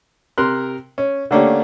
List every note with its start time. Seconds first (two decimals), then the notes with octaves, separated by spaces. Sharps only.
0.38 C3 A#4 C6 F#6
0.98 C#4
1.31 D3 A3 A#3 C#4 D4 G4